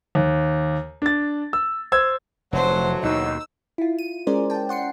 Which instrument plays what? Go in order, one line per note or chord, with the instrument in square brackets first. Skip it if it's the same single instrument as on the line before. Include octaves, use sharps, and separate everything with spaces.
[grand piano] D#2
D4 A6
E6
C5 E6 G#6
[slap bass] F1 [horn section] D3 E3 F#3 [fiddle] A4 C5
[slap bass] D#2 B2 [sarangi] D#4 [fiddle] E6
[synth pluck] E4 F4
D#7
G#3 C#4 G#4 A#4 C5 D5
G5 A5
F#5 C6 C7 C#7